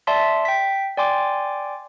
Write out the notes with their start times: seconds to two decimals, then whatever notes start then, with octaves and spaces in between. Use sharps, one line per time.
0.07 D5 E5 A5 C6 B6
0.45 G5 B6
0.97 D5 G5 G#5 C6 D6